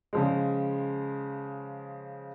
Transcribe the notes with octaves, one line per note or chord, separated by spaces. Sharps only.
C#3 F3 G#3